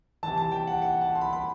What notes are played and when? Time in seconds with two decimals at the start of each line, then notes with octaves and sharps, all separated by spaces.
0.23 C3 E3 A5
0.38 A5
0.52 G5
0.67 F#5
0.82 F#5
1.01 A5
1.15 C6
1.21 B5
1.33 B5